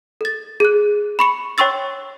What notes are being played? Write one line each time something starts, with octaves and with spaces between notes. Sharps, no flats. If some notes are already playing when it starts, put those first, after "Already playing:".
A4 A6
G#4 F#6
B5 C#6 C#7
C#5 G5 C6 C#6 E6 A6